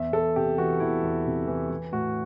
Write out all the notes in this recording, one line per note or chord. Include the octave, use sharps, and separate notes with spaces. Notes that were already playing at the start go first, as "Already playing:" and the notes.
Already playing: E2 E5
E2 A4
C3 G4
E3 F#4
E2 E4
E2
C3
E3
E3
A2 F#4